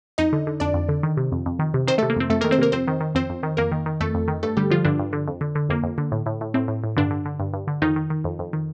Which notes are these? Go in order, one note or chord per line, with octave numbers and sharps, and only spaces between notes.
F2 D#4 D#5
D3
D3
F2 D4 D5
F2
D3
D#3
C3
F2
F2
D#3
C3
D#3 C4 C5
A3 A4
C3
A#3
F2 C4
F2 A3 A4
A#3 A#4
D#3
C4 C5
C3 A#3 A#4
F2 C4 C5
D#3
D#3
F2 C4 C5
F2
D#3
F2 A#3 A#4
D#3
D#3
F2 A3 A4
F2
D#3
G2 A3 A4
D3 G3 G4
D3 F3 F4
G2 D3 D4
G2
D3
F2
D3
D3
F2 A#3
F2
D3
A2
A2
A2
A2 C4
A2
A2
G2 D3 D4
D3
D3
G2
G2
D3
F2 D#3 D#4
D#3
D#3
F2
F2
D#3